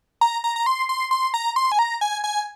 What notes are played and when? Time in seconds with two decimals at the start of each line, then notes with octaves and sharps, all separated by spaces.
0.21 A#5
0.44 A#5
0.56 A#5
0.66 C6
0.89 C6
1.11 C6
1.34 A#5
1.56 C6
1.72 G#5
1.79 A#5
2.01 G#5
2.24 G#5